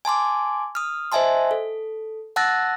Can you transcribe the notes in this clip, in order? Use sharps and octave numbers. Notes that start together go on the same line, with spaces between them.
G#5 A5 C6 D6
D#6 F6
C5 D#5 E5 G#5 A5 C6
A4
F#5 A5 E6 F#6 A6 A#6